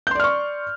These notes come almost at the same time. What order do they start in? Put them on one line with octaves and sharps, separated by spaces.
G6 C6 D5 F6 C#6